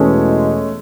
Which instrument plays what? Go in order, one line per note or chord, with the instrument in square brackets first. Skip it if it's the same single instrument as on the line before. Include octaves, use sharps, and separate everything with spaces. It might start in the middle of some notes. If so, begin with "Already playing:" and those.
Already playing: [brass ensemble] E2 B2 G#3 [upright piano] A3 C#4